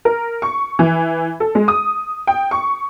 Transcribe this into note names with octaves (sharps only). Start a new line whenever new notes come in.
A#4
C#6
E3
A4
G#3
D#6
G5
C#6